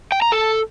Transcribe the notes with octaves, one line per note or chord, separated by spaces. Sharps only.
G5
A#5
A4